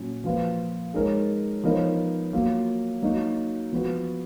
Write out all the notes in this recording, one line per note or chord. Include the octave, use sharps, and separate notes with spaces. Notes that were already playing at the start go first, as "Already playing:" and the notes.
Already playing: A#2 F#3 C#4 F#4
F3 A#3 F4 B4
G#3 D#4 A#4 C#5
F3 B3 D#4 A#4 C#5
F#3 A#3 F4
F#3 A#3 D#4 F#4
F3 B3 F#4 B4